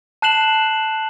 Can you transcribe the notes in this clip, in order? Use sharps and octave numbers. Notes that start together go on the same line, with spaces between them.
A5 F#6 C7 E7 F#7